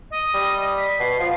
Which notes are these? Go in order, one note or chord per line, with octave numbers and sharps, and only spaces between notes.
D#5
G3
B6
B2 C7
F3